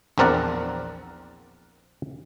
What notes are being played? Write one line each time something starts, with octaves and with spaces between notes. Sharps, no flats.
A#1 E2 C4 A#4 D5 F#5